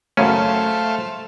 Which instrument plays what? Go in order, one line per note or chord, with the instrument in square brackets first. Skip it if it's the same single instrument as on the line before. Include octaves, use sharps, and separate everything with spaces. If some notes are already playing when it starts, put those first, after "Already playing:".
[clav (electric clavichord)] F#2 C#3 C#4 [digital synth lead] A3 [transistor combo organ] A4 C5 F5